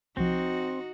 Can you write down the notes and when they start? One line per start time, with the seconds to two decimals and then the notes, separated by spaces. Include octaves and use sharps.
0.17 C2 F3 C4 D#4 F#4